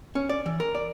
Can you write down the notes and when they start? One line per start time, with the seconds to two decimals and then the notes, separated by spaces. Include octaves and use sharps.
0.15 C#4
0.29 D5
0.46 E3
0.60 A#4
0.75 D5